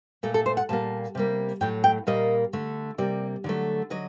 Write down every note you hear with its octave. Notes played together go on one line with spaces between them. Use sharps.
A#2 A3 A4
A4
C5
F#5
A#2 G3 A#3 A5
C3 G3 A#3
A2 F#3 A3 G5
G5
A#2 G3 A#3 D#5
D3 A3
C3 G3 A#3 D5
D3 F#3 A3
D3 F#3 D#5